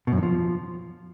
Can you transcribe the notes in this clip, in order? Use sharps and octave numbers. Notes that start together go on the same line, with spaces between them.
B2
F#2
D#3
F3